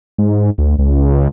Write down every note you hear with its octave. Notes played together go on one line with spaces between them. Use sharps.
G#2
D2
C#2